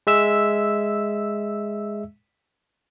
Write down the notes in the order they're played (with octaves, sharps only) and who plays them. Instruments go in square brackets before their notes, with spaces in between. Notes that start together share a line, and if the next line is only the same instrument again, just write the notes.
[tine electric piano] G#3 E5 E6